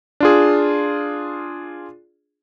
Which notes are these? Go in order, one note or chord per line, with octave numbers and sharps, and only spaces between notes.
D4 F4 G#4